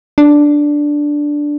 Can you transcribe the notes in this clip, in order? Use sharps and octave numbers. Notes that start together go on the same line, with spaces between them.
D4